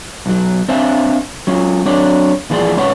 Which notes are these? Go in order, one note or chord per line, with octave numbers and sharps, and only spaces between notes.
B1 F#3
C4 D4 C5 E5 F5 G#5
F#3 C#4 F4
F#3 C4 D4 C#5 D5
A#2 E3 F3 G#4 D5 C6
G#2 B2 C#4 B4 C#5 F#5